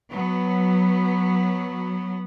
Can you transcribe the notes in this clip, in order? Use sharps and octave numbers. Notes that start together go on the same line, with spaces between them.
F#3 B3